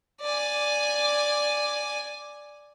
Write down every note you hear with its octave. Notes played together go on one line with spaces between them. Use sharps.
D5 G#5